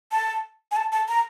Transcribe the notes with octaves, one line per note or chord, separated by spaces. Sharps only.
A5
G#5
A5
A5
A#5